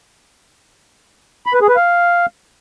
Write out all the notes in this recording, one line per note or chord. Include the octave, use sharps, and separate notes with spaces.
B5
B4
G#4
B4
F5